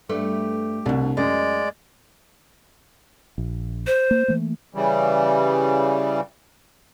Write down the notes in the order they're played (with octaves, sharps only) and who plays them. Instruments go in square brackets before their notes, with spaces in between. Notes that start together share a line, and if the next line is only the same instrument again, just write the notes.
[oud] G2 A3 B4 [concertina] G4
[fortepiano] C2 [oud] B2 D4
[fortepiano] F#2 [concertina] G#3 D5 [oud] D#5
[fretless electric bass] A#1
[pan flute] C5
[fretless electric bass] A#3
E3 A3 A#3
[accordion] C#3 E3 G3